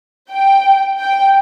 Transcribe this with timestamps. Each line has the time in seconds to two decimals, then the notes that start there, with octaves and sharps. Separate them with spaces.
0.31 G5
0.99 G5